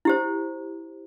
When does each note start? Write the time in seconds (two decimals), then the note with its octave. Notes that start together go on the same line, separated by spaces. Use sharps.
0.05 E4 G4 C5